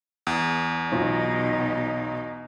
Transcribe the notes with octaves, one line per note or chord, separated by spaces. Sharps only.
E2
B1 B2 D#4 F4